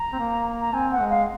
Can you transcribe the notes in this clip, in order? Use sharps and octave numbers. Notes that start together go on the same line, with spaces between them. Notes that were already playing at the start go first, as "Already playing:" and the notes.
Already playing: A#5
C4
A#3
A#5
C4 G#5
F#5
G#3
F5